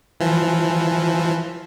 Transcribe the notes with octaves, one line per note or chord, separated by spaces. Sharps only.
E3 F3